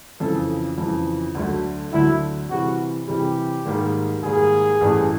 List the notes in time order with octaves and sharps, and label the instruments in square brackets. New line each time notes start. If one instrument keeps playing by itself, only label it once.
[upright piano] F2 C#3 E3 [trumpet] A4
[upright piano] F2 C#3 E3
D2 D3 F#3 A3
[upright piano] D2 D3 F#3 A3 [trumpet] E4
[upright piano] C3 E3 G3 [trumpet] F#4
[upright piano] C3 E3 G3 [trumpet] G4
[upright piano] G#2 D#3 G3 A#3
[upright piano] G#2 D#3 G3 A#3 [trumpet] G#4
[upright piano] A1 G2 E3 A3